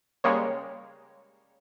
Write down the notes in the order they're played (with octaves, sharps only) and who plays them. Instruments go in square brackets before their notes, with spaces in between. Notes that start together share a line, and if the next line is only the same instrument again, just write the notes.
[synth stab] C#3 G3 G#3 A#3 C#5